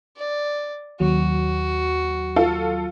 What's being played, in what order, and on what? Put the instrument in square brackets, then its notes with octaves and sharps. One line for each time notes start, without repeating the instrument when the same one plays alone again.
[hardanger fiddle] D5
[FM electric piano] D#2 F#3 [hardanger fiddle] F#4
[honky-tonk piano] F4 A4 F5